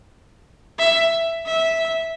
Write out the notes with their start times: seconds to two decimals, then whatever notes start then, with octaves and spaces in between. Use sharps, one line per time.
0.79 E5
1.46 E5